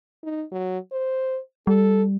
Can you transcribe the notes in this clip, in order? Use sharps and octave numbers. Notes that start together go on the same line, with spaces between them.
D#4
F#3
C5
G3 A4